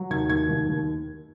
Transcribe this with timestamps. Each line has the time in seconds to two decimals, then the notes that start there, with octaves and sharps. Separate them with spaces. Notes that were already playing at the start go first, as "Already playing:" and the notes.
Already playing: F#3
0.10 D#2 G#6
0.30 D#2 G#6
0.48 D#2
0.67 D#2